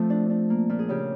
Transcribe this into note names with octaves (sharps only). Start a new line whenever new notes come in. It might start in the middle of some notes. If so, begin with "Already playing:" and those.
Already playing: F3 A3 C4 A4
D4
D4
A#3
A#2
G#4
C#3 G4